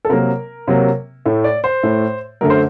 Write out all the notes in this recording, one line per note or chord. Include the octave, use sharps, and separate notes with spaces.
A4
C3 F#3 A#3 A#4
C3 F#3 A#3
A2 A3
D5
C5
A2 A3
F#2 D3 A3 A#4
C5